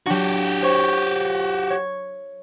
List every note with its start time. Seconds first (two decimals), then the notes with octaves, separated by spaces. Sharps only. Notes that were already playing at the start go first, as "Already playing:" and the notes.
0.06 F#3 D4 F#4 G4
0.62 C5 C#5 C#6
1.70 C#5